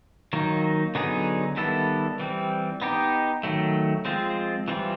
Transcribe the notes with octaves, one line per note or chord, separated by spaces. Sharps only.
D#3 F#3 A#3 D#4
D3 F#3 B3 D#4 G#4
D#3 G3 B3 E4 A4
E3 G3 C4
B3 D#4 G4
D#3 F#3 A3
F3 G#3 C4 F4
E3 G3 C4 F4